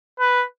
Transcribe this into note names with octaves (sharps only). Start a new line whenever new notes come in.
B4